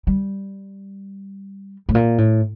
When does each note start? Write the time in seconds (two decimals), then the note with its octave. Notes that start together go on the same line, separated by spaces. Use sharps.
0.07 G3
1.89 A2
1.95 A#2
2.18 A2